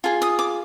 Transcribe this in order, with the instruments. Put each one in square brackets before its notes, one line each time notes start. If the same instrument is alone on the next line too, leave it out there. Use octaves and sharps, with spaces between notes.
[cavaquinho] F4 G#4
D#6
D6